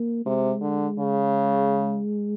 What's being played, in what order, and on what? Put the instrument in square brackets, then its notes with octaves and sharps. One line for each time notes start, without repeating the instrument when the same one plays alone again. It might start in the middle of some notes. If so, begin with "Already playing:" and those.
Already playing: [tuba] A#3
[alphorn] C3 [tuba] G#3
[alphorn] D3
C#3